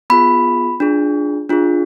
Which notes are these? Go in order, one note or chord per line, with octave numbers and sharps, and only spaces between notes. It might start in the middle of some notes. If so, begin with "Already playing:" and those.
B3 F4 G#4 B5
D4 F4 G#4
D4 F4 G#4